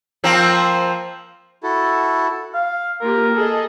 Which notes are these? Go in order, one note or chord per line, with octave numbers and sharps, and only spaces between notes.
F3 A#3 C4
E4 F#4 A4
F5
A#3 F4 G4 A#4
G#4 A4 D#5